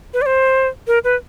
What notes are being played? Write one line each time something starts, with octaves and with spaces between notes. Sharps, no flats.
B4
D5
C5
A#4
B4